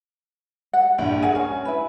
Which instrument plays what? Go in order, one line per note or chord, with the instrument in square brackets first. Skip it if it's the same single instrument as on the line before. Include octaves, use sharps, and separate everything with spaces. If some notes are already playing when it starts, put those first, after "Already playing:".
[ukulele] F#5
[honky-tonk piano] A#1 G2 [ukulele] E4 G5
[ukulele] G#4 A#4 F#5 [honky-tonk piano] G#5
[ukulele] C#4 [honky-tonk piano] G#5
[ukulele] E4 B4